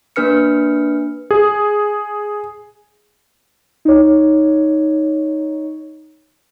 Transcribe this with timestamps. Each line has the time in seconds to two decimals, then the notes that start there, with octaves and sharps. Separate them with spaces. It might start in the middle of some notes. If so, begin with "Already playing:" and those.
0.16 A#3 D4 B4 F6 C#7
1.31 G#4
3.85 D#4 C#5